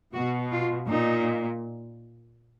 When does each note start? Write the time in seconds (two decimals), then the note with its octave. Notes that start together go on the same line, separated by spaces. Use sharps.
0.14 B2 F#4
0.52 F4
0.87 A#2 D#4